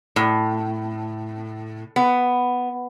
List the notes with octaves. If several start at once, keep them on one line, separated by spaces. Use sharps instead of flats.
A2
B3